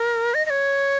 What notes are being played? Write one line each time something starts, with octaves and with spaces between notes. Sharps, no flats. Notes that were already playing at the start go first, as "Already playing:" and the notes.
Already playing: A#4
D#5
D#5
C#5